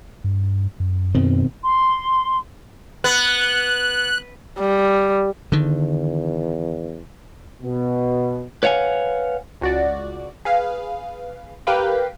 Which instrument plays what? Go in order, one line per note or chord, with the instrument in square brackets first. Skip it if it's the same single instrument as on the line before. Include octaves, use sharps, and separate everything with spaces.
[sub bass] G2
F#2
[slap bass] B2 D#3 C4
[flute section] C6
[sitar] B3 [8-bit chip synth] F#6
[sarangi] G3
[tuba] E2 [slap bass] D3 D#3
[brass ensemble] B2
[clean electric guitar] B4 C#5 F5 F#5 G#5
[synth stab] C#2 F#4 D5
G#4 B4 F5
G4 A#4 B4 F5 G5